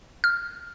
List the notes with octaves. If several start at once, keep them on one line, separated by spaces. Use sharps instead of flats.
F6